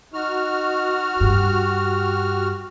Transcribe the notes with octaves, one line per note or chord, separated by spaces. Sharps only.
D#4 F#4 F6
G2 G4